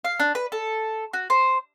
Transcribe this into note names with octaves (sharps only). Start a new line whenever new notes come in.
F5
D4
B4
A4
F#4
C5